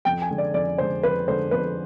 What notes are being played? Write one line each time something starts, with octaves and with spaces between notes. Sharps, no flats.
F2 G5
G#5
D3 G#3
D5
F2 D5
D3 G#3 C5
F2 B4
D3 G#3 C5
F2 B4